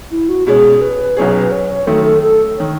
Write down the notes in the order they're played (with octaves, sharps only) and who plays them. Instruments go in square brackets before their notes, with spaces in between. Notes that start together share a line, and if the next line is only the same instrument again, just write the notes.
[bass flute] E4
F#4
[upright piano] B2 G#3 C#4 [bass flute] G#4
[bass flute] B4
[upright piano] B1 B2 F#3 C#4 G#4 [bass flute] C#5
[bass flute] B4
C#5
C#5
[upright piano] F#2 D#3 A3 [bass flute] A4
[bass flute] A4
A4
[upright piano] D#3 [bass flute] C#5